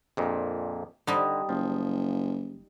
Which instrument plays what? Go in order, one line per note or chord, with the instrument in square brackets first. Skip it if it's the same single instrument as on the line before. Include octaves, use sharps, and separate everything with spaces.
[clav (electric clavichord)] A#1 F2 A#2
[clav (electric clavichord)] D3 [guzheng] G3 D#4
[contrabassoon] F#1 [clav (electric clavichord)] F3